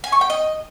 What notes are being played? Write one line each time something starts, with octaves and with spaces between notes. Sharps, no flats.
G#5
C#6
G5
D#5